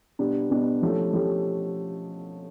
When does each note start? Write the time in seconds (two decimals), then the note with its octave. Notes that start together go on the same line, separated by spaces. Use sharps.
0.19 B2 G3 B3 D4
0.50 B2 G3 B3 D4
0.82 F3 A3 C#4 E4 G4
1.13 F3 A3 C#4 E4 G4